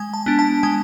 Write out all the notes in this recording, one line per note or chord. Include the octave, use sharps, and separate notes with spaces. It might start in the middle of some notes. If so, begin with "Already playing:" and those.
Already playing: G#3 G#5
A5
B3 D4
A5
G#3 G#5